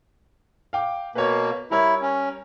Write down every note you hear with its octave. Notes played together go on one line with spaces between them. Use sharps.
F5 G5 D6
B2 A#3 B4 C#5
G3 E4 A#4 C#5
C#4